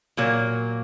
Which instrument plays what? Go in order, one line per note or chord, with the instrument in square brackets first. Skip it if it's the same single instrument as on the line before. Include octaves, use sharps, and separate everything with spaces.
[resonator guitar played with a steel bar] A#2 F#3 A#3